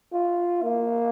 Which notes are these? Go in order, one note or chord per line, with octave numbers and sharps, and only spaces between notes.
F4
A#3